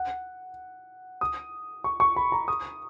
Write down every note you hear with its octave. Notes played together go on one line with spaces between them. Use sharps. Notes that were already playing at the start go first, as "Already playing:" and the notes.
Already playing: F#5
D#6
C#6
C#6
B5
A#5
D#6